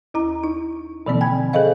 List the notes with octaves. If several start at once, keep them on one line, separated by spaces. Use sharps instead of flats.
D#2 E4 A#5
D#4
B2 D3 E3 F3 A#3 C4
G5 G#5 B5 G#6
G#4 A4 C5 D#5 F5